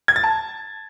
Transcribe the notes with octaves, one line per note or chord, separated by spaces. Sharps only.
G#6
A6
A5